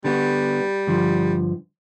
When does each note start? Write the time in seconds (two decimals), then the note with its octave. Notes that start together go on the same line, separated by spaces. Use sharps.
0.04 D3 G3 B3 F#4
0.87 G2 D3 F3